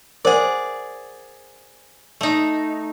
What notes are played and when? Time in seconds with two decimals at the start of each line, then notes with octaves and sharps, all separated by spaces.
0.25 G#4 A#4 C5 D5 F#5
2.21 A3 D#4